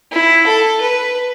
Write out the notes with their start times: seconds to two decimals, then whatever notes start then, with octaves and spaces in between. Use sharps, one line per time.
0.12 E4
0.47 A4
0.81 B4